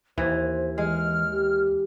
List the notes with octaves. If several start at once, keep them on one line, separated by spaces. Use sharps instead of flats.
D#2 E3 C5
E3 G#3 F6
G4